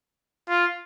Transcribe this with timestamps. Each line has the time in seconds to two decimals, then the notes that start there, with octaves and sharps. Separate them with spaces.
0.49 F4